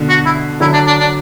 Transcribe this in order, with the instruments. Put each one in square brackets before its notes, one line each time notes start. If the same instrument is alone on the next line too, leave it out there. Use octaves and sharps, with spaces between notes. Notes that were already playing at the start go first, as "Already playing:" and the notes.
Already playing: [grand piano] B2 D3
[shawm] F#4
E4
[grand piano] D3 F#3 [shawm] E4
[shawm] D4
D4
D4